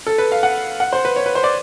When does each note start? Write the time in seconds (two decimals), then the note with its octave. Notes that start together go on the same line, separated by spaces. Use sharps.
0.07 A4
0.18 B4
0.32 F5
0.43 F#5
0.80 F#5
0.93 C5
1.05 B4
1.16 C#5
1.26 B4
1.35 C5
1.44 D5